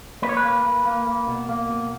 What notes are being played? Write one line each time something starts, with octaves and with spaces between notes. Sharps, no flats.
A#3 B4
C#5
B4
A#3
A#3
A#3
A#3
B2
A#3
B2